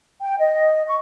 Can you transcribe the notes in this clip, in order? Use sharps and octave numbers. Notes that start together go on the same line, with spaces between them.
G5
D#5
C#6